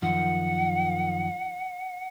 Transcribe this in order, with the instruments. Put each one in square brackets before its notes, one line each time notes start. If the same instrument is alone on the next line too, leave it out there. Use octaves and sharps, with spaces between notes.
[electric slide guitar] F#2 D#3 F3 [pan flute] F#5